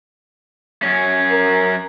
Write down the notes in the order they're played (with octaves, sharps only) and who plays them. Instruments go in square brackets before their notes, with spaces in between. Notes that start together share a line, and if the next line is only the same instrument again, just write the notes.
[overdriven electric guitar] F#2 C#4
[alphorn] A#4